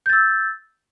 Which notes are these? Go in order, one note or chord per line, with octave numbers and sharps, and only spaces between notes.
E6 G6 A6